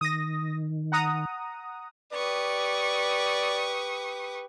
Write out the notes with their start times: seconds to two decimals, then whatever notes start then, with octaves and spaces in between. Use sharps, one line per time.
0.01 D#3 D#6 A#6
0.92 F#5 A#5 D#6
2.13 G4 B4 D5 C#6 D#6